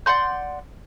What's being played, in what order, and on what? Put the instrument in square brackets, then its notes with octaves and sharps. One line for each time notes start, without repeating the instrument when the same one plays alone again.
[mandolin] D5 F#5 C6 G6